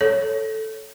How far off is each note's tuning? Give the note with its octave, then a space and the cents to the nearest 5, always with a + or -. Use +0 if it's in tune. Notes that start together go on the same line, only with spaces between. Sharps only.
A4 +0 C#5 +0